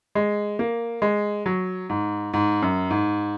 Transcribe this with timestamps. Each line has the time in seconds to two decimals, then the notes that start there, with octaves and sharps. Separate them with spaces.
0.15 G#3
0.59 A#3
1.02 G#3
1.46 F#3
1.89 G#2
2.34 G#2
2.62 F#2
2.90 G#2